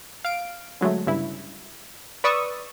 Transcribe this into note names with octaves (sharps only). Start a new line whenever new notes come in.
F5 D7
D3 F#3 G#3 A3
G1 G2 C#3 E4
B4 D5 C#6 D#6 E6